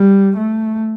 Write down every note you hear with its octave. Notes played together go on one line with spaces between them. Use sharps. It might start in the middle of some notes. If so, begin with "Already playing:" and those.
Already playing: G3
A3